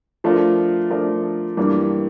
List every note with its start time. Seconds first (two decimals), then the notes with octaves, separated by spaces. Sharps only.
0.24 F3 A3 D4 F4 A#4
0.90 F3 A3 D4 F4 A#4
1.57 G2 E3 G3 A#3 D4